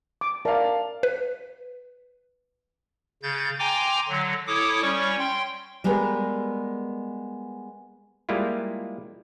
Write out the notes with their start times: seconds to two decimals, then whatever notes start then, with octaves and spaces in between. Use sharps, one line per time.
0.21 D6
0.45 A#4 D5 E5 F5 A5
1.03 B4
3.23 C#3 G6 A6
3.59 G5 G#5 A#5 C6 D6
4.09 D3 F#3
4.47 E4 A4 C#5 D6 D#6
4.82 G3 C#4 C#5 C#6
5.18 G5 C6
5.84 G3 G#3 B3 A#4 B4
8.29 G3 G#3 A#3 E4 F4